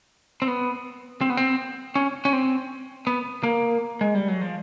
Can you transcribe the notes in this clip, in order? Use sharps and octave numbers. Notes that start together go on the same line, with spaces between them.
C4
B3
C4
B3
C4
C#4
C#4
C4
B3
A#3
G#3
G3
F#3
F3